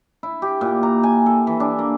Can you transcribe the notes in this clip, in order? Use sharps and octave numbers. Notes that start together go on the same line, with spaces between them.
E4
G4
A#2
A#5
G#5
A4
E3
D4
A#3